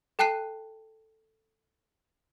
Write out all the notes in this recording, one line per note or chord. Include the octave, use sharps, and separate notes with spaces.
A4 G5 A5 F#6 C7 D#7